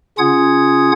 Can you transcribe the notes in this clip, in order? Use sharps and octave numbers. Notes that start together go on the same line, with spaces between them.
C#3 C#4 F4 F#5 D#6 G#6